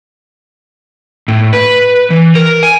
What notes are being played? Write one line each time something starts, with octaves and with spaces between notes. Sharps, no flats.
A2
B4
E3
A#4
G#5